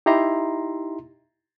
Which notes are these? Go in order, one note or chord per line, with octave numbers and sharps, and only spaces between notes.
D#4 E4 G4 E5 A#5 C6